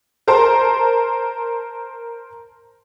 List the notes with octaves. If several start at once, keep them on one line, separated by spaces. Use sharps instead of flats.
A#4 C5 A5 A#5 C6